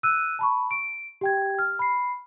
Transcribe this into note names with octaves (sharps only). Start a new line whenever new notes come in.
E6 F#6 D#7
A5 B5 C#6
D7
G4 G5 G#6
F6
B5 C7